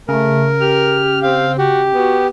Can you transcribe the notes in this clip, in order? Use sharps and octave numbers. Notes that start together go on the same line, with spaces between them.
C#3 A3 A#4
G4 F6
C4 F5
F#4 G4
B3 F#4